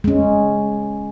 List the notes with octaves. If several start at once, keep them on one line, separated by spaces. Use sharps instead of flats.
G#3 C#4